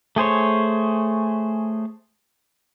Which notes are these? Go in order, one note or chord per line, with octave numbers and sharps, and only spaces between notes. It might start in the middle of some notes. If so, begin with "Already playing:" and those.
A3 G#4 C5 C#5